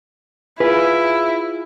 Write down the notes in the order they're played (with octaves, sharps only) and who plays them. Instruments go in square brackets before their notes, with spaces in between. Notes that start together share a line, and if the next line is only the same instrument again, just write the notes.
[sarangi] E4 [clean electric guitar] F4 G#4 [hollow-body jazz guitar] B4